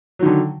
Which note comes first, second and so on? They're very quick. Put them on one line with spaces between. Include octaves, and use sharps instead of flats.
F#3 D#3 D3